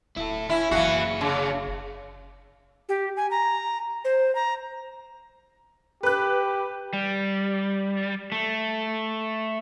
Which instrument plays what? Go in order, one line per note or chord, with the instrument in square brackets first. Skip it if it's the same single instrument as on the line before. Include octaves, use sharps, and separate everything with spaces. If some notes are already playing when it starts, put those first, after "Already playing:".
[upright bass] D1 [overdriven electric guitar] E4 A4
[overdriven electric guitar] C#4 [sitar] E4
[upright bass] F#1 E4 [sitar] E3 F#4 [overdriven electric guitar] G#4 F5
[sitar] C#3
[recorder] G4
G#5
A#5
C5
A#5
[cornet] G4 [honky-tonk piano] B4 F#6
[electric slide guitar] G3
A3